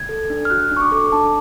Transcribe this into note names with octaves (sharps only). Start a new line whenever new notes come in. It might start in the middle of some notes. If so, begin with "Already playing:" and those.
Already playing: G#6
A4
D4
F6
F#4 F#6
D4
C#6
D6
A4
D6
D4 A5